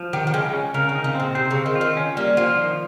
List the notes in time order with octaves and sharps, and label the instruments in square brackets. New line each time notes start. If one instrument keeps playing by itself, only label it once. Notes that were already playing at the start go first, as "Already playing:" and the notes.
Already playing: [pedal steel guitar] F3
[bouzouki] D#3 [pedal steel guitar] G4
[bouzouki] D#3
[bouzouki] C#3 [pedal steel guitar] G#3
[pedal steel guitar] C#4
[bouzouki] C#3 [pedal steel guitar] A#4
[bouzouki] D#3
[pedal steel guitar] D#4
[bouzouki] C#3
[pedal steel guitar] C4
[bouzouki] A#2
[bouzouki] C3 [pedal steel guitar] C5
[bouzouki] C#3 [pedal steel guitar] C4
[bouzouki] D#3
[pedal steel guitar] F4
[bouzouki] D#3
[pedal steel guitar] C#4
[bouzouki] G3 [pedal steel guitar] A#3
[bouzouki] F3 [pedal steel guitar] F4
[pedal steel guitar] D#3